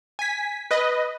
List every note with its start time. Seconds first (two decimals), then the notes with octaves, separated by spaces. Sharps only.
0.19 G#5 B6
0.71 B4 D#5